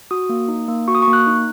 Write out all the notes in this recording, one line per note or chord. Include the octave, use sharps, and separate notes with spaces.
F#4 D#6
A#3
D#4
A#3
F#4 C#6
D#6
C#6
A#3
F#6
D#4